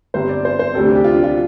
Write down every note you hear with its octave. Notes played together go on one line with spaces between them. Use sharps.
G1 G2 G3 C4 C5
D5
C5
C5
D2 C3 G3 C4 A4
D4
G4
F4
D4
F4